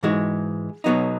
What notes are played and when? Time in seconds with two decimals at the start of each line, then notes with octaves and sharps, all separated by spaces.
0.03 G#2 E3 G#3 D#4 F#4
0.84 B1 B2 F#3 B3 D#4